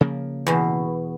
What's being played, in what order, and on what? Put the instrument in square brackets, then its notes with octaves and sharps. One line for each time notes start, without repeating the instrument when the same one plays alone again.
[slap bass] C#3 F3 A#3
[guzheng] E2 B2